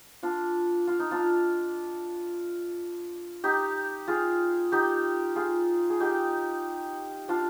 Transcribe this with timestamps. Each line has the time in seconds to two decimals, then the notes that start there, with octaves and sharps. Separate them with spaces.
0.23 D4 F4
0.87 F4
0.99 D#4
1.11 D4 F4
3.44 D#4 G4
4.08 F4 G#4
4.72 D#4 G4
5.36 F4 G#4
5.90 G#4
6.00 D#4 G4
7.29 D4 F4